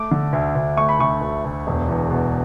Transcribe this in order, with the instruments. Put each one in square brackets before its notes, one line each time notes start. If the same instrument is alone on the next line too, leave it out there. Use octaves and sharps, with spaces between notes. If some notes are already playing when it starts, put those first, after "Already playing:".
Already playing: [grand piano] A3 D6
D3
D2
D2
A3 C#6
B5
D2 C#6
D2
D2
E1
E2
B2